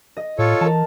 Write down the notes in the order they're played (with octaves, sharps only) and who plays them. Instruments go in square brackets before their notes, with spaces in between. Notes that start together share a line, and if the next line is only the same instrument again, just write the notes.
[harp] D#5
[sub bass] A2 [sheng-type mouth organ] F4 A4 C#5
[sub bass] E3 [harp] A#4 A5